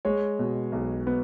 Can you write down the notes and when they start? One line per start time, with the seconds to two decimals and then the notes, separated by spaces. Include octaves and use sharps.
0.05 G#3 C#5
0.39 B2
0.72 B1
1.07 B3